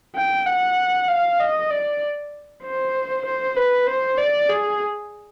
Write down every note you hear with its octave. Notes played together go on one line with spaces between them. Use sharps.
G5
F#5
F5
D#5
D5
C5
C5
B4
C5
D5
G#4